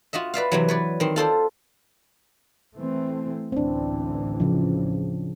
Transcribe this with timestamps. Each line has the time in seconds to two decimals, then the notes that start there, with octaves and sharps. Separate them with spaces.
0.13 F4 F#4 D#5 E5
0.34 B4 D5 E5 F5
0.52 C3 E3 F#3
0.68 B4 C#5 D5
1.00 D#3 C4
1.16 F4 A4 C5 D5
2.75 E3 A3 C4
3.52 A1 D2 E3 C4 D4
4.40 C#3 F3